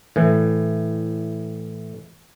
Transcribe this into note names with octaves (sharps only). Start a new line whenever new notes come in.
A2 E3